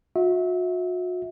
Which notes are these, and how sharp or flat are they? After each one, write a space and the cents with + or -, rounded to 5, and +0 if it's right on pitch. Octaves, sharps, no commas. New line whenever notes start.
F#4 -40 E5 -25